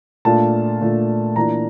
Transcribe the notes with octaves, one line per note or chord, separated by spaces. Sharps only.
A#2 A3 D4 F4 A5
A#2 A3 D4 F4
E3 A#3 D4 F4 A#5